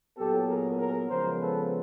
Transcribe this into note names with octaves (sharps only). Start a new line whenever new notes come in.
A#2 F#3 B3 G4 A4
G#4 A#4
G#4 A#4
C#3 F3 G#3 B3 A#4 C5
A4 B4